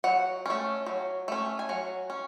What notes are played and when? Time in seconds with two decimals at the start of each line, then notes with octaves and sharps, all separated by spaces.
0.04 F#3 F#5
0.46 A3 C#4
0.86 F#3
1.28 A3 C#4
1.59 G#5
1.69 F#3 F#5
2.10 C#4